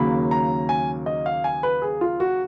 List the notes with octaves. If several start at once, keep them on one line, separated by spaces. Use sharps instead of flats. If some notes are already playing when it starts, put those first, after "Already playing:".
Already playing: D#2 C#3 F#3 A#3 B5
A#5
G#5
D#5
F5
G#5
B4
G#4
F4
F#4